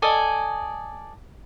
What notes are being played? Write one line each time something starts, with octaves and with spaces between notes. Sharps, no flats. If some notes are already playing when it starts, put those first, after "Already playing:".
A4 D5 D#5 G#5